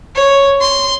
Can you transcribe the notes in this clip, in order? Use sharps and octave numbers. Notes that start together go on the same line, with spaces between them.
C#5
C6